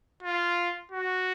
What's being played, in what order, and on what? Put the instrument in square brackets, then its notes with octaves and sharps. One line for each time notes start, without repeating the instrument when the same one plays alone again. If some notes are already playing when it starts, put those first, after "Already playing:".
[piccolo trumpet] F4
F#4